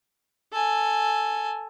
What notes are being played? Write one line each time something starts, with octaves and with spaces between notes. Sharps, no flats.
A4 G#5